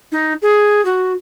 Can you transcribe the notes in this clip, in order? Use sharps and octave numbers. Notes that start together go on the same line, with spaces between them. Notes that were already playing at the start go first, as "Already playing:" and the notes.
D#4
G#4
F#4